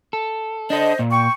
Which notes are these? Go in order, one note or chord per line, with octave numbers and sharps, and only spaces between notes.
A4
D4 A4 C5 D#5
A#2
G5 C#6